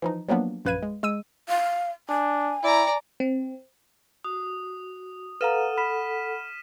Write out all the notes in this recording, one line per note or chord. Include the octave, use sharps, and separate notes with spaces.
E3 F3 D#4
F3 F#3 A#3 B3 D4
A#1 F#2 B4 F5 G#6 D#7
G#3
G#3 E6 D#7
F5
D4 G#5
E4 D5 A#5
C4
F#4 D#6
A4 B4 F5 F#5 A#5 F6 D#7 E7
B5 F6 B6 E7